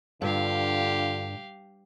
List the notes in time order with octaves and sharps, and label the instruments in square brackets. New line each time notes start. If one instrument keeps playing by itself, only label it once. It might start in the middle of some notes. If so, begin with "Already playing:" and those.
[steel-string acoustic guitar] G2 [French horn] D3 [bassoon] F4 [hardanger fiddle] G4 F5